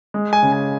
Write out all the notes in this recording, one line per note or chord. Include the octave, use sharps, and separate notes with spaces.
G#3
G#5
C#3
G#5